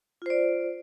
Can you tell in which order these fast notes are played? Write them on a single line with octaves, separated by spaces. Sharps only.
F4 C5 D5